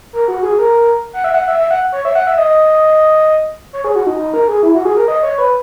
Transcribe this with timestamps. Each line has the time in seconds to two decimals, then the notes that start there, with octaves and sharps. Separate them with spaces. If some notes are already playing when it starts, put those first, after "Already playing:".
0.13 A#4
0.28 F#4
0.43 G#4
0.59 A#4
1.13 F#5
1.24 E5
1.34 F#5
1.48 E5
1.59 E5
1.71 F#5
1.92 C#5
2.05 E5
2.15 F#5
2.27 E5
2.38 D#5
3.73 C#5
3.84 G#4
3.95 F#4
4.07 D#4
4.19 D#4
4.34 A#4
4.48 G#4
4.63 E4
4.75 F#4
4.85 G#4
4.97 A#4
5.08 D#5
5.23 C#5
5.38 B4